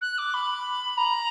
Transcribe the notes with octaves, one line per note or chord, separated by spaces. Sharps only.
F#6
D6
B5
A#5